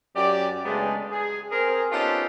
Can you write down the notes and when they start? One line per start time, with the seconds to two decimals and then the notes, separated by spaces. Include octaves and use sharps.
0.16 F#2 G4 D5
0.65 C#3 G#3 A3 B3 D4 D#4
1.11 G#4
1.51 C4 G#4 A#4
1.92 B3 C#4 D#4 F4 G4 A4